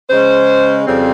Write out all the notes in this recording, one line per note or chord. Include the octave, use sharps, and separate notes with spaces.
C#3 G#3 C#4 C5
F2 C#3 G3 C4